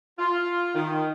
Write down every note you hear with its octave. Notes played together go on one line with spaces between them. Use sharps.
F4
D#3